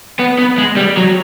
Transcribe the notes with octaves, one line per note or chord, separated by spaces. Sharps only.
B3
B3
G#3
G3
F#3